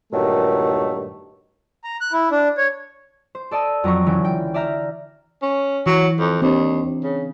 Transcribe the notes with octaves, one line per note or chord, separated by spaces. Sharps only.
G2 A#2 D#3 F#3 A3
A#5
F#6
E4
D4
C#5
C5
A4 D5 D#5 A5 E6
F2 F#3 A#5 B5 C#6
C#2 D3 E3 F#3 C#4 G5
G5
D5 E5 A#5 F6 G6
C#4
E3 F#3
F2
D#2 C4 D4
C#3